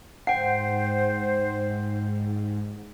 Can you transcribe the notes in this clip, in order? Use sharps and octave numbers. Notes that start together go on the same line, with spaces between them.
G#2 C5 F#5 G5 C7